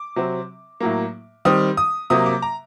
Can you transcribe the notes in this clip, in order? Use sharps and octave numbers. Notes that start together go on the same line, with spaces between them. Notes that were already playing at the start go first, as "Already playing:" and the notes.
Already playing: D6
C3 F#3 C4
A2 F#3 A#3
D#3 G3 C4 D#6
D#6
C3 F#3 A#3 D#6
D6
A#5